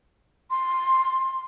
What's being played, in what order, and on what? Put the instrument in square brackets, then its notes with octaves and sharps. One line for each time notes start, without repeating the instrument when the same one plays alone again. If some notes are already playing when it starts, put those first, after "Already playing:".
[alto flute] C6